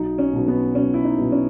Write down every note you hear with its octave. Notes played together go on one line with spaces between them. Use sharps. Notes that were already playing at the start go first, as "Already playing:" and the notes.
Already playing: B1 D#4
C#4
B2 F#3 B3
B3
B1 C#4
E4
D#4
B2 F#3 B3
C#4